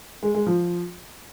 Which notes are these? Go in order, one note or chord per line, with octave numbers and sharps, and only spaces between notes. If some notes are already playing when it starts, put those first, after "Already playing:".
G#3
G#3
F3